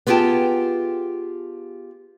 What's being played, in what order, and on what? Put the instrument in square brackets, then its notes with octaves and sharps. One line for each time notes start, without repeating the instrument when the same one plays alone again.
[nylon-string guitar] B3 F4 G4 G#4 G5 A5